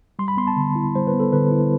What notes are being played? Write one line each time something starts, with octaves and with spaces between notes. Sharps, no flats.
G3 C6
B5
B3 C6
A5
D3
E4
G3 C5
B4
B3
A4
D3 B4
E4